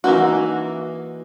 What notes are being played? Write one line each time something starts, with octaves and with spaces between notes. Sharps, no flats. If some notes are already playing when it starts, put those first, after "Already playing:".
E3 A#3 D#4 F#4